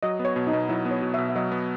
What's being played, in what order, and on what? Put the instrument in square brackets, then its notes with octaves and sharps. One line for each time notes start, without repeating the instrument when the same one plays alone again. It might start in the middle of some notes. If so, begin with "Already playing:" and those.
[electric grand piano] F#3 [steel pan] D#5
[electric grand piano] B3
[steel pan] C#5
[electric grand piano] B2
[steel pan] D#4
[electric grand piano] B2
[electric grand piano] F#3 [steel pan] E4
[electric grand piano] B3
[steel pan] C#5
[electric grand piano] B2
[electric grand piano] B2 [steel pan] E5
[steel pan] E5
[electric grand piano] F#3 [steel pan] D#5
[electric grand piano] B3